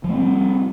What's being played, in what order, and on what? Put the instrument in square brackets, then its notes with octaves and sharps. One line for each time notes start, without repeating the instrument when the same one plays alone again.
[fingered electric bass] F3
A3
C4
G3